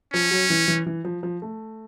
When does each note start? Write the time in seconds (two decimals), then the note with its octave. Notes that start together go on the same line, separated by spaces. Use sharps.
0.13 F3 C#4
0.31 F#3
0.50 E3
0.68 E3
0.86 E3
1.05 F3
1.23 F3
1.42 A3